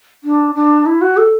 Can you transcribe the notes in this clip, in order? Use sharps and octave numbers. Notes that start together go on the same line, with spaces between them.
D4
D4
E4
F#4
A4